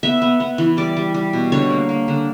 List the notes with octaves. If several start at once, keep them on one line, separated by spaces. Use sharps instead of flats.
B3 E5
B3
B3
E3
G3 D5
G3
G3
B2
D3 C#5
A#3
A#3
D3